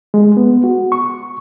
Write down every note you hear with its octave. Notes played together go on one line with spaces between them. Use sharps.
G#3
B3
F#4
C#6